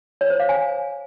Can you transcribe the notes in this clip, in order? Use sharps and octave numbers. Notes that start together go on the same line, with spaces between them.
C#5
C5
F5
G#5